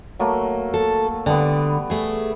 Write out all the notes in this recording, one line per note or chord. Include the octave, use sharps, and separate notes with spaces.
F#3 A3 A#3
A4
D3 G3 B3
A3 G#4